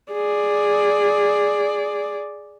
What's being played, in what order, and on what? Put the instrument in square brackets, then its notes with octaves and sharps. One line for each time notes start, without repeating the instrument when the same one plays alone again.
[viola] G#4 D5